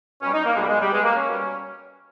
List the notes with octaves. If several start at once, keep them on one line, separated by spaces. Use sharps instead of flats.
B2 G3 C#4
D#4
A#3
B2 G3 G#3
G#3
G3
B2 G3 G#3
A#3
C#4
B2 G3